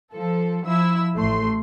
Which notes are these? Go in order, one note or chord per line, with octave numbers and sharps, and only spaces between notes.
F3 A4
F3 E4 E6
A1 A3 C6